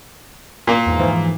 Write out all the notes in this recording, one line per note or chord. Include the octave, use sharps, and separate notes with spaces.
A#2 A#3
E2 G#2
G#2 E3 F3